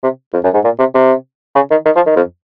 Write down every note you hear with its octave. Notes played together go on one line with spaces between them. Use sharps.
C3
F2
F#2
G#2
A#2
C3
C3
C#3
D#3
D#3
F3
D#3
F2